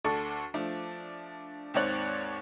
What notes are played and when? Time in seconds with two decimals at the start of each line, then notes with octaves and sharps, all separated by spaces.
0.04 D2 D4 A4 C#6
0.54 F3 A3 D4
1.74 D#2 G#2 C4 C#5 D5 F#6